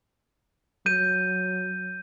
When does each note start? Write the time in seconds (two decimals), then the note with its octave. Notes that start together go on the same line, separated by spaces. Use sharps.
0.86 F#3 G6 D#7